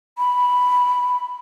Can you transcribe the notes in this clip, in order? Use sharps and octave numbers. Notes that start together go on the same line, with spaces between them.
B5